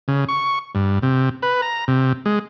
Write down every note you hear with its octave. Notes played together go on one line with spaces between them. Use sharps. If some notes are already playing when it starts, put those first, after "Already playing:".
C#3
C#6
G2
C3
B4
A#5
C3
G#3